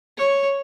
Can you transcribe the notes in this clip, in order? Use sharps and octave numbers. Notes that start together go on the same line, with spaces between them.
C#5